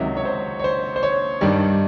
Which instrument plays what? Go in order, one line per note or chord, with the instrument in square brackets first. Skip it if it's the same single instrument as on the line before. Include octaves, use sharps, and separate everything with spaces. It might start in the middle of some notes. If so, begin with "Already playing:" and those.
Already playing: [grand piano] C#2 C3 D#3 F#3 E5
C#5
C5
C#5
C5
C5
C#5
G2 D#3 G3 D5